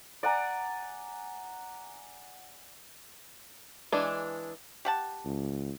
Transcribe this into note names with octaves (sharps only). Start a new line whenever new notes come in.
D5 F#5 G#5 A#5
E3 G#3 D4
G4 F#5 A5
C#2